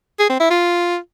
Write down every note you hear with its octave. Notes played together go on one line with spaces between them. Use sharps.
G#4
C4
E4
F4